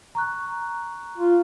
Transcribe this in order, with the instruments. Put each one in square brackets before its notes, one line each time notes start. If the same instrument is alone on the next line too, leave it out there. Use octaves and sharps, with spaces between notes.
[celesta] A#5 C#6 F#6
[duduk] F4